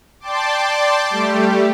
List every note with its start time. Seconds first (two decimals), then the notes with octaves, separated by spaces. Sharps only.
0.20 D5 G5 A5 C6 D6
1.10 G3 A3 G4